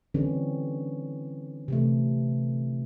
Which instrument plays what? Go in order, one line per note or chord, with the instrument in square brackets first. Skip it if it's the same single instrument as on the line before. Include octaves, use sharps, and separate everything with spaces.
[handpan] D3 E3 G3 C4 C#4
C3 E3 A3